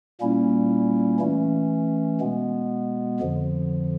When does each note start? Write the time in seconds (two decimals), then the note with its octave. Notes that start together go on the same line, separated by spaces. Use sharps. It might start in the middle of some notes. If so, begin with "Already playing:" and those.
0.21 A#2 G3 A#3 C#4 E4
1.20 E3 A3 C#4
2.21 B2 G#3 B3
3.20 F2 D3 F3